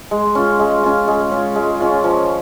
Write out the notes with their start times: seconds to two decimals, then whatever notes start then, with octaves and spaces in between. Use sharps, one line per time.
0.11 G#3
0.35 C#4 F4
0.59 G#3
0.84 C#4 F4
1.08 G#3
1.32 C#4 F4
1.56 G#3
1.80 C#4 F4
2.04 F3